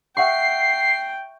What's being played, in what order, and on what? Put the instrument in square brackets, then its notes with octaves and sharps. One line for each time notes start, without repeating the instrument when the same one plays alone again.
[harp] E5 F#5 C#6 [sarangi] G5 [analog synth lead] C7